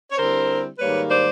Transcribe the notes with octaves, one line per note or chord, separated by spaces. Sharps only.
C#5
D3 G3 C4 E4 A#4 C5
G#2 D#3 G3 A#3 B4 C#5
C5 D5